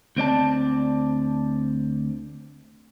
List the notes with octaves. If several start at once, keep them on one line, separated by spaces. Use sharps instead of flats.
D2 C4 D5 A5